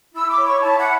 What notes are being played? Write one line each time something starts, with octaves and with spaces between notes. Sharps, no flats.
E4 E6
D6
C#5
C#6
E4 A5
F#5